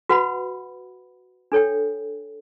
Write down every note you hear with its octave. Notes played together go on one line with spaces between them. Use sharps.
F#4 B4 F#5 B5
D4 A4 C#5 G5